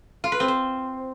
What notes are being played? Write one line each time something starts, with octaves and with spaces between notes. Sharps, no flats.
F4
B4
C4
C5